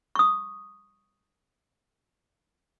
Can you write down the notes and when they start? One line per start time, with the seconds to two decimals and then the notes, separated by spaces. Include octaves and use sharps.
0.15 C#6 D#6